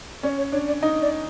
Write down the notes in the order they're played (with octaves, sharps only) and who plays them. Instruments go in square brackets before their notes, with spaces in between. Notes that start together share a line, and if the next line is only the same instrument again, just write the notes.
[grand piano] C#4 [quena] D5
[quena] C#5
[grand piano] D4 [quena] C#5
[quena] D5
[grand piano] D#4 [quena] D#5
[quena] D5